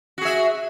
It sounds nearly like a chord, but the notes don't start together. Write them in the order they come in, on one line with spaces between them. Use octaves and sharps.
F#4 G#4 E5